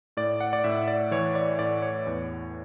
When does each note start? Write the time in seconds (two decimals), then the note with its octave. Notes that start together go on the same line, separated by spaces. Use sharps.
0.17 A2 D5
0.40 F#5
0.53 D5
0.64 A2 E5
0.88 D5
1.11 E3 C#5
1.35 D5
1.59 A2 D5
1.82 C#5
2.06 E2